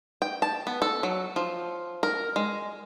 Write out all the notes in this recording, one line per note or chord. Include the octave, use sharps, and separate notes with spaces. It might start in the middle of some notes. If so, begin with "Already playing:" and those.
G5
A5
B3
A4
F#3
F3
A#4
G#3